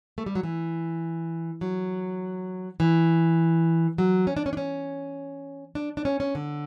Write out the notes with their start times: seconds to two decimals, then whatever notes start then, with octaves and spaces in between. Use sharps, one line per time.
0.18 A3
0.26 G3
0.35 F#3
0.43 E3
1.61 F#3
2.80 E3
3.98 F#3
4.27 C#4
4.37 D4
4.46 C#4
4.53 D4
4.57 C#4
5.75 D4
5.97 D4
6.05 C#4
6.20 C#4
6.35 D3